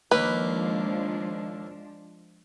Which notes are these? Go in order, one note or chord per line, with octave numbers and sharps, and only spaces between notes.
D#2 F3 G#3 A#3 D4 B4